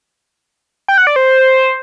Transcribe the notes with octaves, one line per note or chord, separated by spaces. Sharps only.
G5
F#5
D5
C5